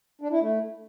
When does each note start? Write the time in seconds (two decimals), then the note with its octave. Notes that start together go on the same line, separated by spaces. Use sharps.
0.21 D4
0.31 E4
0.41 A3